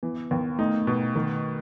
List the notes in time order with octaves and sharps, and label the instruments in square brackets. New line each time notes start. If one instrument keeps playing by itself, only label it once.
[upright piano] E3 [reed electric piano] B3
[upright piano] D#2 [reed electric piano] B3
[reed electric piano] A3 [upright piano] D#4
[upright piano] B2
D#3